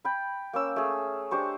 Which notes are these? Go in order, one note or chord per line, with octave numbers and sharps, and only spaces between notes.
G5 B5
A#3 C#4 E6
A3 G#4
D4 G4 C5 C#6